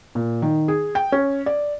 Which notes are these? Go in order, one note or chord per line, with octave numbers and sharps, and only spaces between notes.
A#2
D#3
G#4
G5
C#4
D5